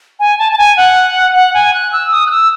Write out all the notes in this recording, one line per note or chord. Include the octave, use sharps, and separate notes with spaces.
G#5
A5
A5
G#5
F#5
F#5
G#5
F#6
E6
D#6
F#6
E6